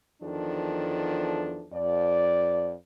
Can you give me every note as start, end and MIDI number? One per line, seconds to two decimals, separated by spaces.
0.22 1.66 40
0.22 1.66 51
0.22 1.66 53
0.22 1.66 62
0.22 1.66 69
1.73 2.72 41
1.73 2.72 74